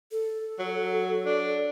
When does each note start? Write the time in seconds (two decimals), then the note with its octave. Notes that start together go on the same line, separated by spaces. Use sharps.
0.12 A4
0.59 F#3
1.26 D4